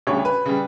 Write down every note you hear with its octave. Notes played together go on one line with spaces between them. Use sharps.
D2 C#3 G3 C#5
B4
C#3 G3